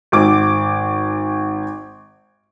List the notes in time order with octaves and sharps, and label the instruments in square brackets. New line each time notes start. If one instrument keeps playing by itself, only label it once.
[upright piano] G#1 D6